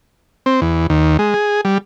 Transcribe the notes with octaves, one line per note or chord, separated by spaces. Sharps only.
C4
E2
D#2
G#3
G#4
G3